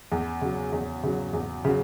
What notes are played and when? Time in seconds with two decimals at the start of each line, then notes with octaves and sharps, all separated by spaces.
0.12 E2
0.41 C#3 F#3
0.72 E2
1.03 C#3 F#3
1.33 E2
1.65 C#3 F#3